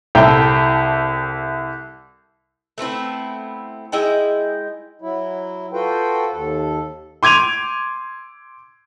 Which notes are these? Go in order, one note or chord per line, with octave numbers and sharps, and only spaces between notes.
C2 E4 A4 G5 A#5
A3 B3 C4 E4
G#3 E4 D#5 G5
F#3 E4
F4 F#4 A4 B4 C5 G5
D#2 A4
C6 D6 G#6 D#7 F7